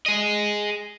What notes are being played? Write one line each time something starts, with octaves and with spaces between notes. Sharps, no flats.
G#4 D#5